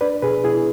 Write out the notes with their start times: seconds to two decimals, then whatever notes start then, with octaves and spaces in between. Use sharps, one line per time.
0.01 D4 B4 D5
0.22 B2 G#4 B4
0.44 B2 E4 G#4